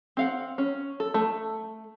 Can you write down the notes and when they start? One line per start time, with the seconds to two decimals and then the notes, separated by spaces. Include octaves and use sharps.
0.17 C4 F5 F#5
0.58 C#4
1.00 A4
1.14 A3